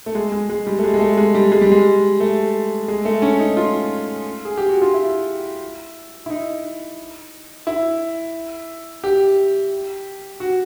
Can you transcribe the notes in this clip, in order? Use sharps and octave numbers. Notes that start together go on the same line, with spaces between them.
A3
G#3
G#3
G#3
G3
A3
G#3
G#3
A3
G#3
G3
G#3
G3
G#3
A3
G#3
A3
C#4
D#4
F4
G#4
G4
F#4
F4
E4
E4
D#4
E4
G4
F#4